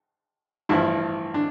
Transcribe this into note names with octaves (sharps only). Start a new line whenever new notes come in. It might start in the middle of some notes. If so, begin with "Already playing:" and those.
A1 G2 F3 E4
D4